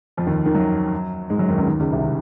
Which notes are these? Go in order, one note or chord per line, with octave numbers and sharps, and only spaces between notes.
F2 F3
D#2 D#3
D#2 D#3
F#2 F#3
G#2 G#3
F#2 F#3
D#2 D#3
C#2 C#3
D#2 D#3
C#2 C#3
C2 C3
C#3